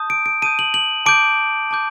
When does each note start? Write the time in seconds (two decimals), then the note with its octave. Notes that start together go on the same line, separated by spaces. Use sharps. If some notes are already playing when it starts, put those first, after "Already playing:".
Already playing: A5 D#6 G6
0.10 D7
0.26 D7
0.42 A5 D#6 G6 D#7
0.59 F#7
0.74 F#7
1.06 A5 D6 G6 D7
1.71 A5 D6 G6